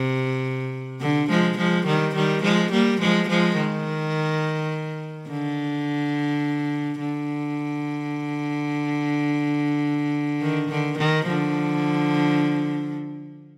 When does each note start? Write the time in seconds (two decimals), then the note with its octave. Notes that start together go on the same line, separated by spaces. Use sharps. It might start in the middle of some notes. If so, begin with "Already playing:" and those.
Already playing: C3
1.01 D3
1.29 F3 G#3
1.58 F3 G#3
1.86 D#3 G3
2.15 D#3 G3
2.43 F3 G#3
2.72 G3 A#3
3.01 F3 G#3
3.29 F3 G#3
3.57 D#3
5.28 D3
6.99 D3
10.41 D#3
10.69 D3
10.98 D#3
11.26 D3 F3